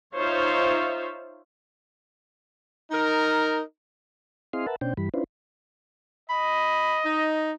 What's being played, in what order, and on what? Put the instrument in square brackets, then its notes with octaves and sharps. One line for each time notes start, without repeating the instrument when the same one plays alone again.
[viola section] D#4 F4 C5 C#5 E5 F5
[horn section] D#4 A#4
[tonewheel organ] C4 E4 G#4 D#5 F5 C6
A#4 B4 E5 F#5 A5
B2 C#4 D4 C5 G5
G2 E3 G3 B5
C#4 D4 E4 F4 B4 C5
[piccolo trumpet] D#5 [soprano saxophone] B5
[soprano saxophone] D#4